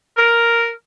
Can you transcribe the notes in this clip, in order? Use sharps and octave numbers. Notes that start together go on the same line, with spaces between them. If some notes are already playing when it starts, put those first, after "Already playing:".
A#4